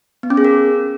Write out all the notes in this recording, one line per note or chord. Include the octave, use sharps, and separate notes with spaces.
B3
C#4
G#4
A#4